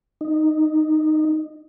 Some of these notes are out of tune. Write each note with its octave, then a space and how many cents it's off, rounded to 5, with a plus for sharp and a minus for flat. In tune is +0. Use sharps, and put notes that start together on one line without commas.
D#4 -10